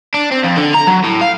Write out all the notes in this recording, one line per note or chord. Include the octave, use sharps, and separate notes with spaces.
D4
C4
F2
D3
A#5
F#3
A2
F5